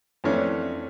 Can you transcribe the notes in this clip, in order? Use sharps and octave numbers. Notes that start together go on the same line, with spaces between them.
F2 E3 A3 C#4 D4